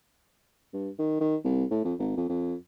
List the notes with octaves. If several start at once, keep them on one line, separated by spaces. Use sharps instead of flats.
G2
D#3
D#3
C2
A2
F2
G#1
F2
F2